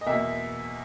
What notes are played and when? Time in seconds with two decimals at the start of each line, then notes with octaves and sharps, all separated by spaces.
0.01 D#5
0.06 E2 B2 A#3 E5